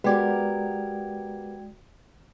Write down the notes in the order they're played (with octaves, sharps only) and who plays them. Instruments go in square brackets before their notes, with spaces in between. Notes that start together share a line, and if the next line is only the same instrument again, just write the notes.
[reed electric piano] G#3 D5 [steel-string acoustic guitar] B3 G4 A#4 [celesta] F#4 G5 G#6